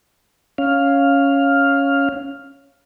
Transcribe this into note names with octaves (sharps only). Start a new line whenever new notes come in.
C#4 F5